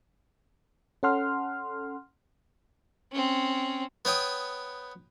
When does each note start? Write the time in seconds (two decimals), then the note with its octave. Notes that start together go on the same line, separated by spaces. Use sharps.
1.03 C#4 A4 F#5 C6 F6
3.12 C4 C#4
4.05 B3 C#5 G5 D#6